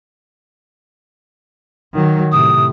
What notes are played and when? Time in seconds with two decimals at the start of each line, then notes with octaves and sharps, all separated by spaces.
1.94 D#3 F#3
2.32 A2 C3 D#6